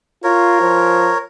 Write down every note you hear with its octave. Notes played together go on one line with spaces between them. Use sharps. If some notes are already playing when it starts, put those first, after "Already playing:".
F4 A#4 C#5
F3